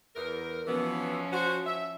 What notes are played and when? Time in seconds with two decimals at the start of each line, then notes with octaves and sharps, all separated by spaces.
0.16 E2 A#4
0.67 B2 E3 F3 B3 C#4
1.32 F#4 C5
1.66 E5